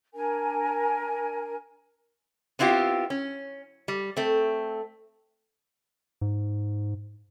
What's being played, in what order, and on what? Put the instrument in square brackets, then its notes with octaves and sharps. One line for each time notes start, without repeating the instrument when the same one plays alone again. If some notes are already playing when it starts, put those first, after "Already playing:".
[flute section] D4 A#4 G#5
[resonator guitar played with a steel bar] B3 C4 E4 F4 G4
C#4
G3
A3 C4
[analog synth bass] G#2